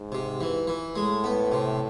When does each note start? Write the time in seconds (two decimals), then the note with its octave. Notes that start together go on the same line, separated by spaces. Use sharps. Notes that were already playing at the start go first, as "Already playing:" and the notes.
Already playing: G#2
0.12 C3
0.41 E3
0.67 E3
0.96 A2 G#3
1.24 B3
1.52 C3